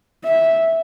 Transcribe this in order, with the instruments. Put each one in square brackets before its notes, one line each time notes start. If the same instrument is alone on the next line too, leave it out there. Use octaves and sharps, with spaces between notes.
[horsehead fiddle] E5